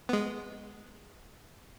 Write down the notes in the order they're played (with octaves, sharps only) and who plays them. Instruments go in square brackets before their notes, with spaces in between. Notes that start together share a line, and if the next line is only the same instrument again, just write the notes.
[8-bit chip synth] G#3 B3